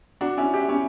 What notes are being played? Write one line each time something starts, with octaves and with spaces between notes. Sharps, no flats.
D4 F#4
C#4 E4
E4 G4
C#4 E4